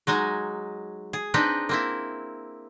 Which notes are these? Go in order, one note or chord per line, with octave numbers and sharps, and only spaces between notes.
F#3 G#3 D#4 G#5
G#4
C4 D4 D#4 B4
A#3 C4 E4